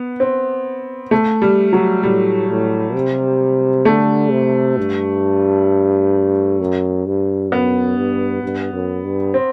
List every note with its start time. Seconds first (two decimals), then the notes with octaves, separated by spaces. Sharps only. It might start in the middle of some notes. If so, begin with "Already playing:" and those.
Already playing: B3
0.20 C4
1.11 A3
1.42 G3
1.73 F#3
2.03 A2 G3
2.49 A2
2.94 C3
3.85 D3 A3
4.31 C3
4.78 G2
6.60 F#2
7.06 G2
7.51 F#2 B3
7.98 G2
8.43 G2
8.73 F#2
9.03 G2
9.34 C4